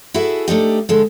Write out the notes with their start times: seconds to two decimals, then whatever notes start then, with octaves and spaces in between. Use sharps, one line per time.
0.14 E4 F#4 G#4 A4 E5
0.48 A3 D4 D#4 G4
0.89 D3 G#3 A4